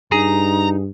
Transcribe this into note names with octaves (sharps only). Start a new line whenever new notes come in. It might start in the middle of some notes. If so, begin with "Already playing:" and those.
G2 D#4 G#4 A#5